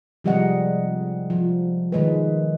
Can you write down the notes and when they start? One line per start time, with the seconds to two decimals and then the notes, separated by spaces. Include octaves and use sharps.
0.24 C3 F3 G3 G#3 D#5 F#5
1.30 F3
1.92 D#3 G#3 B4